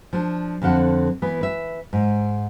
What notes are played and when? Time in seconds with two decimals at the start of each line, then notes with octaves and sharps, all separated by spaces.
0.13 F3 D4
0.62 F2 D3 F3 F#5
1.22 E3 B3
1.41 B4 E5
1.93 G#2